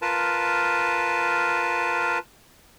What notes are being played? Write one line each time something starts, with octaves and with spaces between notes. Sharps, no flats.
F4 A#4 B4 A5